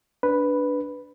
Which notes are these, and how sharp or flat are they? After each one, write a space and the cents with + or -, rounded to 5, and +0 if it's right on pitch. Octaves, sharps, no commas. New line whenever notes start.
D4 -10 B4 +0